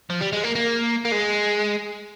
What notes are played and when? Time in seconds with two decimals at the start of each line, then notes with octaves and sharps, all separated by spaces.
0.10 F3
0.21 G3
0.33 G#3
0.44 A#3
0.55 A#3
1.05 A#3
1.12 G#3